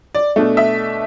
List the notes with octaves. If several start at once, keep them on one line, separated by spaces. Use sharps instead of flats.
D5
B2 A3 D4
E5